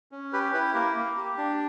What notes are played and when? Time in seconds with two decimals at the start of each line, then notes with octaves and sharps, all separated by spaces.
0.12 C#4
0.33 G4 B4
0.53 E4 B4
0.74 A#3 A#4
0.95 A#3
1.17 G4
1.37 D4